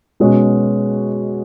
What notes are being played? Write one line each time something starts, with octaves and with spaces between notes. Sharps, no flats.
B2 G#3 C#4 F#4